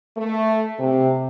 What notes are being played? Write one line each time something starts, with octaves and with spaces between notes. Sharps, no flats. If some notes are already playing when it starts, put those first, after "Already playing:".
A3
C3